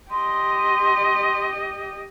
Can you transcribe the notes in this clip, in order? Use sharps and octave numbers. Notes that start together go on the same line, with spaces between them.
G4 D#5 C6